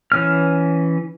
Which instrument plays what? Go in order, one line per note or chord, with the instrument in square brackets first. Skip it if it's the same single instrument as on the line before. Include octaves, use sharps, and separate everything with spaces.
[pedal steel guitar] E3 C#4 F6